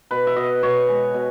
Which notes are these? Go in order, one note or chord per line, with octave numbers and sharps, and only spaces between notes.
B2 B4
E5
B2 D#5
B2 C#5
G#3
B2